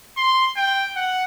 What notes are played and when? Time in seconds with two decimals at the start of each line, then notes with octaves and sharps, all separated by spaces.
0.17 C6
0.56 G5
0.96 F#5